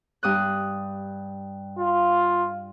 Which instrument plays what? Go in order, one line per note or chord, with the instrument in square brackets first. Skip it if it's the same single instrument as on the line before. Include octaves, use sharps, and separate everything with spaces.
[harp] G2 D#6 F#6
[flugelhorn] F4